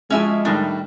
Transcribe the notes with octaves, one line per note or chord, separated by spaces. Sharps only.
F3 G#3 C#4 E4 F#4 E5 G#5
A2 D#3 G3 D4 D#4